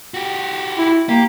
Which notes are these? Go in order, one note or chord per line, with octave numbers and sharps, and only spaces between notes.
F#4 G4
E4
A#3 G4